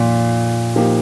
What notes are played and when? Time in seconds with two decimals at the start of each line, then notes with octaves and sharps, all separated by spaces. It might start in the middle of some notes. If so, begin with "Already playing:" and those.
Already playing: F2 A#2 D#3
0.76 F3 A#3 D#4 G4